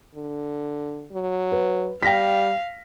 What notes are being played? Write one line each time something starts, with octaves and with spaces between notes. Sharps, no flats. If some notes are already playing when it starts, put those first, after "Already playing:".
D3
F#3
B4
G3 F5 G5 A#6 B6